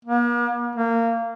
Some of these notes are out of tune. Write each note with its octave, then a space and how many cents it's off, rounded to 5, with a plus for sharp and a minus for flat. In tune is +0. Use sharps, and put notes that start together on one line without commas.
A#3 +45
A#3 -20